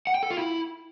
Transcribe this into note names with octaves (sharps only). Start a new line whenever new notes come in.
F#5
G5
A4
F4
E4